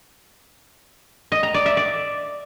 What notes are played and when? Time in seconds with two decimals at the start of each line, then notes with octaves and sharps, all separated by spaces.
1.32 D#5
1.43 A#5
1.54 D5
1.66 E5
1.77 D5